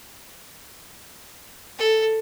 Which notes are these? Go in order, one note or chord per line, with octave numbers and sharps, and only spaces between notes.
A4